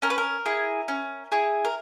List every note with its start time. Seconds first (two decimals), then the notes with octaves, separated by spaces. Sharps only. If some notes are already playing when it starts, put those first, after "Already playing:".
0.02 C#4 A#4
0.10 B4
0.18 A#4
0.46 E4 G#4
0.88 C#4
1.32 E4 G#4
1.65 A#4